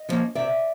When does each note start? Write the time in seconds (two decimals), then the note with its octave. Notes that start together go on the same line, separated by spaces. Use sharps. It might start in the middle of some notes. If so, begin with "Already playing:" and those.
Already playing: D#5
0.09 D3 F3 A#3 C#4
0.35 C3 D5 E5